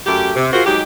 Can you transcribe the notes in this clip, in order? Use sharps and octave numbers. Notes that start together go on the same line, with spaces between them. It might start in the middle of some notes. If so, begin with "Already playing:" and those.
F#2 A3 G4
C3
F4 F#4 G#4 A#4 C5
F#3 G#3 D#4 G4